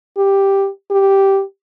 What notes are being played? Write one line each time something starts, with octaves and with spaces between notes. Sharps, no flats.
G4
G4